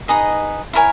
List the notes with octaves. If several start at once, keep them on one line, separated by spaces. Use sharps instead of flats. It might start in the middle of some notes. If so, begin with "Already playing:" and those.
D#4 G#4 B4 D#5
E4 A#4 C#5 G#5